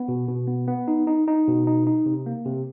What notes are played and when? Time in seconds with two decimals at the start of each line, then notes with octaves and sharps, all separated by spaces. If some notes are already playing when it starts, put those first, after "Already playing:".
Already playing: B3
0.08 B2
0.28 B2
0.48 B3
0.68 B3
0.88 D#4
1.07 D#4
1.28 D#4
1.47 B2
1.67 D#4
1.87 D#4
2.06 C3
2.26 A#3
2.46 C3